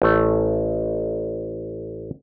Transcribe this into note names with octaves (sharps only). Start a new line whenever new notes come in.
A1 A3